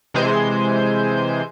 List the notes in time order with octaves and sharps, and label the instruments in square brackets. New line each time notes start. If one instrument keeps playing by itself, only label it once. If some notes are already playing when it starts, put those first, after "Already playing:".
[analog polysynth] C3 E3 G#3 C5 G#5 G6